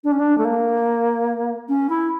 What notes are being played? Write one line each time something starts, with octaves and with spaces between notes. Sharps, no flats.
D4
C#4
D4
A3
A#3
C#4
E4